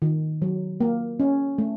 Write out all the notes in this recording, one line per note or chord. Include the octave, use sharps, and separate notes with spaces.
D#3
F#3
A#3
C#4
A3